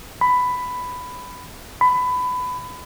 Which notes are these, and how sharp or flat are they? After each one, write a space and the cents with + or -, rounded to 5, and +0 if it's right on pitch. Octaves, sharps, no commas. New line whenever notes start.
B5 +10
B5 +20